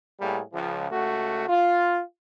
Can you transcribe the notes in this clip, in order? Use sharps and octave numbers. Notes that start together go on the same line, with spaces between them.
A2 G3 A#3 G#4
C#2 F3
C#2 A3 F#4
F4